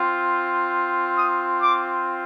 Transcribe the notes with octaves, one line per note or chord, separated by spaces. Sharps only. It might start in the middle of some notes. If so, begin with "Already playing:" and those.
Already playing: C4 F4
D#6
D6